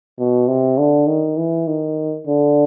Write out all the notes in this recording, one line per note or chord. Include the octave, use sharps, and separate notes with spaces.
B2
C3
D3
D#3
E3
D#3
D3